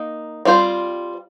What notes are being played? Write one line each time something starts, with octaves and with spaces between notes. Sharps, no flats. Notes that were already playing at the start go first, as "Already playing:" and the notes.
Already playing: A#3 D#4
G3 C4 F4 C5